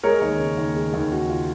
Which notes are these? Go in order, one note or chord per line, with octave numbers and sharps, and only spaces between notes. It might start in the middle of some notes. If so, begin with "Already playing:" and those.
G#3 A#4 C#5
D#2
C#3
D#2
G#3
D#2
C#3 F#4
F4